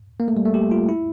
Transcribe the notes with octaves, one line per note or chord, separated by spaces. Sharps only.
A#3
A3
G3
A3
G4
F4
E4